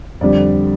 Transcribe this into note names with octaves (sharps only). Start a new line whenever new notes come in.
F2 D3 G3 D5